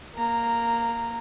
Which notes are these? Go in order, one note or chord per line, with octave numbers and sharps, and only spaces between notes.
A#3 A#5